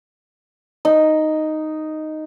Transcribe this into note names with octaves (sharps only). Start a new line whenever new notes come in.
D#4